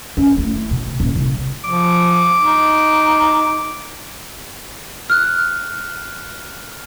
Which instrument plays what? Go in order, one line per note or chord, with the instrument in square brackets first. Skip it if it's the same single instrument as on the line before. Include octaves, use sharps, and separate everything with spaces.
[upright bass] C#4
A3 E4
B2
D#1
C2
[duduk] F3 [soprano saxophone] D6
[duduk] D#4
[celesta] F6 F#6